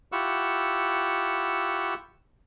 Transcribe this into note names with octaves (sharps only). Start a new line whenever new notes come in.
E4 F4 G4 F#5 C#6 E6